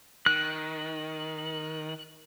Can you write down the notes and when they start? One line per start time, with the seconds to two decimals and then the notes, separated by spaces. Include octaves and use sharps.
0.26 D#3 F#6